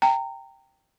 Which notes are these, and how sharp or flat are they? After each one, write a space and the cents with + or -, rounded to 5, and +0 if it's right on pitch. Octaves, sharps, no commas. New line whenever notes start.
G5 +0 A#5 -25